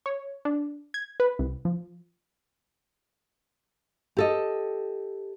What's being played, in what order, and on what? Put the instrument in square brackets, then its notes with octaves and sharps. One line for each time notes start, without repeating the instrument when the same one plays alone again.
[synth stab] C#5
D4
G#6
B4
C2
F3
[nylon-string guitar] G4 A4 D#5